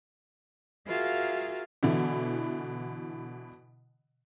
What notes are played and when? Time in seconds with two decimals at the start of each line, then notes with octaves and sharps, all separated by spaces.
0.87 F4 F#4 G#4 A#4 E5 F5
1.83 B2 D3 E3